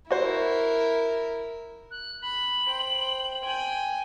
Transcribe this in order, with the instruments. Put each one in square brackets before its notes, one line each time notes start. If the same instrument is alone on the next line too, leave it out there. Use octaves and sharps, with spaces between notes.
[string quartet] E4 A#4 [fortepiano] F#4 C5
[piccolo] F#6
[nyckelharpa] B5 [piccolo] F#7
[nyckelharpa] C5 G5
G5 G#5